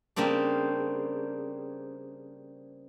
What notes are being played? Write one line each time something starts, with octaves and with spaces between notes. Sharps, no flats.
C#3 G3 A#3 C4 D4